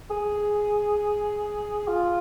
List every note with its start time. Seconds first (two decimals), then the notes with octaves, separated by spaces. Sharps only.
0.11 G#4
1.88 F4